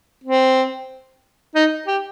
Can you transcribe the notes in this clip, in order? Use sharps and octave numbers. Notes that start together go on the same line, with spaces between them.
C4
D#4
G4